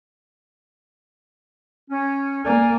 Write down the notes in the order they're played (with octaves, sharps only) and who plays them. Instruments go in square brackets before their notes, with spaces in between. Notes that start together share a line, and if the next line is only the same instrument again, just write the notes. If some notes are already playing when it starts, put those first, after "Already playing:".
[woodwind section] C#4
[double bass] A#3 [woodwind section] D5 G#5